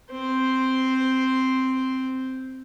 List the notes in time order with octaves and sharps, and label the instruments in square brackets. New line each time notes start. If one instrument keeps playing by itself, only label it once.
[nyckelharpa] C4 C5